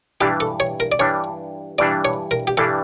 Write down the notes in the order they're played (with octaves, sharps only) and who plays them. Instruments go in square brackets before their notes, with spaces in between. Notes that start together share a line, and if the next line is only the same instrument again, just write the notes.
[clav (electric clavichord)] G2 E3 G3 D4 [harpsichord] G4
[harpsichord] A4
C#5
A#4
D5
[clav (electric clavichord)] G2 E3 G3 D4 [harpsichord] C#5
[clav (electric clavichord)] G2 E3 G3 D4 [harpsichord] D5
[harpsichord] C#5
A#4
G4
[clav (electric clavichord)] G2 E3 G3 D4 [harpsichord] A4